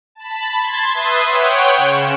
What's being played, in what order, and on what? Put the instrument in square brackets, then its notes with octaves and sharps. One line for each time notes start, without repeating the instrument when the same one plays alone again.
[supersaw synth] A5 B5
C6 G#6 A6
B4 E5 C6 D#6
C#5 F#5 G5
C#3 E7